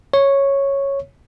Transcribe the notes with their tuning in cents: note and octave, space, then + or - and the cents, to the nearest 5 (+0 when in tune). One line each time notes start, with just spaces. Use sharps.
C#5 -5